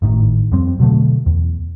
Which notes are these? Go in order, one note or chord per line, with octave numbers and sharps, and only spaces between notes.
G#1 A2 D#3
F2 G3 C4
B2 D3 F#3 A3
E2